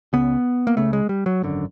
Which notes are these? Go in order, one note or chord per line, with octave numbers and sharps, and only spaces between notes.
C#2 C#3 B3
A#3
C#2 C#3 A3
G#3
G3
F#3
G#1 F#2 D3